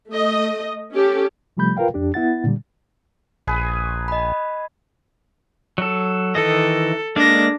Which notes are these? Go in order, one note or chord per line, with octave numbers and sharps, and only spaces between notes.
A3 D#5
C#4 G4 A4
C3 F3 G3 A3 B5 G6
F4 A#4 B4 F5 G5
F2 D4 G4
B3 E4 F#5 A6
A#2 D3 G3
A#1 G#4 B4 G#5
D#5 B5
F#3 A4
D#3 E3 A4 D#5
G#3 A#3 D4 D5 A#6